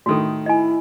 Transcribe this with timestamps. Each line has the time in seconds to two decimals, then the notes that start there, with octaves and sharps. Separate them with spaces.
0.06 A2 D#3 F#4 A4
0.46 E4 D#5 G#5